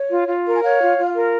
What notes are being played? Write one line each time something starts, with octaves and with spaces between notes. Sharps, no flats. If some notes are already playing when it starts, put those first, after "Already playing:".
Already playing: C#5
F4
F4
A#4
G#5
C#5 F5
F4
F4
A#4